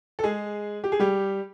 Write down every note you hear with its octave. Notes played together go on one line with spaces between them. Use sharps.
A4
G#3 G#4
G4
G#4
G3 G4